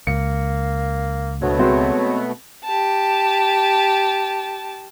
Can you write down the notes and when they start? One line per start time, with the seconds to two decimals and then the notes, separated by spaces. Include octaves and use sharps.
0.07 C#2 A#3 C#7
1.42 D2 B2 F#3 A3 B3
1.59 G#3 C4 F#4
2.64 G4 A5